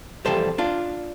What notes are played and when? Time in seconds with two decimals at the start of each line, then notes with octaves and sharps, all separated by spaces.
0.25 F2 C3 E3 G3 A4 C5
0.58 D4 F4